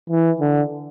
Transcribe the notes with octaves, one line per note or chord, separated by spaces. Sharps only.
E3
D3